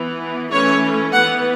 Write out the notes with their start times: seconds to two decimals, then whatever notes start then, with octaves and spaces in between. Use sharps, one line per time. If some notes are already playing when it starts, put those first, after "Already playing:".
Already playing: E3 B3
0.52 E3 A3 C#4 C#5
1.13 E3 B3 F#5